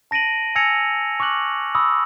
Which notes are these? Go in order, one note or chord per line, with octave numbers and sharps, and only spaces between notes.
A5 A#6 D7 D#7 F#7
G#5 E6 G#6 A#6 C#7 F7
C#6 D6 F6 F#6 F#7
B5 C#6 D#6 E6